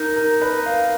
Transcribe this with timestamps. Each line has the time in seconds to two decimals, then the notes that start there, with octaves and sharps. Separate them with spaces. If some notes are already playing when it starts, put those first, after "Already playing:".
Already playing: D#4 A#4
0.16 A#4
0.42 B4
0.66 F5